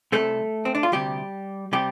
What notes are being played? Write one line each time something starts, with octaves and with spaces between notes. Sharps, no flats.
C2 C3 A3 A4
C4
D4
F4
D2 C3 G3 G4
C3 G3 G4